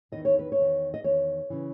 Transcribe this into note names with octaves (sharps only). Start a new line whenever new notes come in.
E2 D#3 D#5
C#5
B4
C#5
E2 D#3
D#5
E2 D#3 C#5
C#3 E3